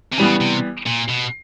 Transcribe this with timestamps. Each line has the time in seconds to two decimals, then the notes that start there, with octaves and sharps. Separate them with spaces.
0.12 C3
0.18 C#3 E3 G3 B3
0.41 C3
0.87 A#2
1.09 B2